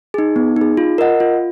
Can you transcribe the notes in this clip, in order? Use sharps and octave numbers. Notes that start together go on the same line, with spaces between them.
D#4 G#4
B3
D#4 G#4
F4
A#4 D#5 F#5
F4